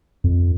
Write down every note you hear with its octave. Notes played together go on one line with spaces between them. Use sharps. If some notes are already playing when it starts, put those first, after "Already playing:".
F2